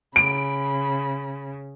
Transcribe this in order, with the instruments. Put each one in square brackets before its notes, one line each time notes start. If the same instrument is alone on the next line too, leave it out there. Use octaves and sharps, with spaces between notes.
[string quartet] C#3 [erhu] B5 [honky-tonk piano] D7